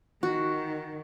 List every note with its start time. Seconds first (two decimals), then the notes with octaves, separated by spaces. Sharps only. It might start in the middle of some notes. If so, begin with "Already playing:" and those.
0.23 D#3 F#4